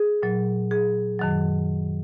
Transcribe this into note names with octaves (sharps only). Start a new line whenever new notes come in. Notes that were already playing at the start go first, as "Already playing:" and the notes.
Already playing: G#4
A#2 F#3
G#4
F#2 D#3 F#3